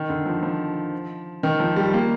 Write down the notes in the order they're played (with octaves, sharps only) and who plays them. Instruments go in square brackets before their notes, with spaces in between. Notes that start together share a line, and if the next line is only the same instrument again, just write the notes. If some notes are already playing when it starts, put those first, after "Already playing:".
Already playing: [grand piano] D#3
D3
F3
F3
D#3
F3
G3
A#3